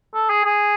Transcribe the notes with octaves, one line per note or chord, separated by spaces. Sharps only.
A4
G#4
G#4